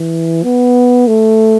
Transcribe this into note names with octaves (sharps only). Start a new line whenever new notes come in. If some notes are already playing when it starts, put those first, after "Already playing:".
Already playing: E3
B3
A3